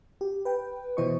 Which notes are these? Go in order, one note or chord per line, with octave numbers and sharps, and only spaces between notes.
G4
B4 G5
B2 E3 E4 C5 D#5 C#6